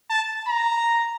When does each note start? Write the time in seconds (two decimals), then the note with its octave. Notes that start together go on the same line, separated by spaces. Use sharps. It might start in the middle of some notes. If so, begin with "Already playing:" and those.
0.10 A5
0.48 A#5